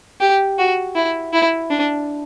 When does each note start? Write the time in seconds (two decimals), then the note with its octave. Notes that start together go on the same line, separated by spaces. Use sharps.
0.21 G4
0.58 F#4
0.96 E4
1.33 E4
1.70 D4